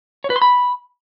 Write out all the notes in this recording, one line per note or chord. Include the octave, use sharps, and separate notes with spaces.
C#5
B4
C6
B5